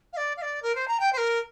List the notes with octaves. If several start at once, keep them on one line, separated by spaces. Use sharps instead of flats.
F5
D5
F5
D5
A#4
C5
A#5
G5
C5
A#4